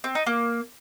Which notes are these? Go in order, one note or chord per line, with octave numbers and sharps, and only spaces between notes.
C4
D#4
A#3